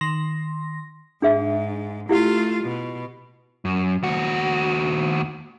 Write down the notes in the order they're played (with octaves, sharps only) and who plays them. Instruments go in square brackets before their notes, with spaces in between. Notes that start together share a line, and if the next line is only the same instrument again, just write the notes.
[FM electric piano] D#3 C6 A#6
[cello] G#2 [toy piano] D4 G#4 E5
[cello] A3 F4 [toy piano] E4 G4 F5
[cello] B2
[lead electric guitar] F#2
D#2 F#4